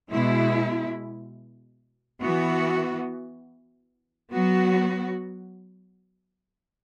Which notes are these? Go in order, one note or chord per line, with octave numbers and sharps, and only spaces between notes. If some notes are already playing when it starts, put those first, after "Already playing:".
B2 G#3 E4
E3 B3 F#4
F#3 B3 F#4